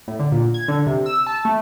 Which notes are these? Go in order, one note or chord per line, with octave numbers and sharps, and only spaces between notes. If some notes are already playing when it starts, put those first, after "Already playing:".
A2
D3
A#2
G#6
D3
C3
E6
A5
A3